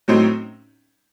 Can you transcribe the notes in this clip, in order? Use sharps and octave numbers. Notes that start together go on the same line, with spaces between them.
A2 F#3 A3 C4 D#4